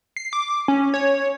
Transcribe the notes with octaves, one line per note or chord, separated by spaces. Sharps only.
C7
D6
C#4
C#5